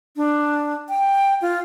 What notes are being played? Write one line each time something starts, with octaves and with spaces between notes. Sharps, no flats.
D4
G5
F4